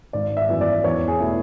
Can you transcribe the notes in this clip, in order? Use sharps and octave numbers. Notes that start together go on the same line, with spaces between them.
G#1 D5
E5
F#2 E3 B3
D5
E2 C#5
G#4
B2 A3 E4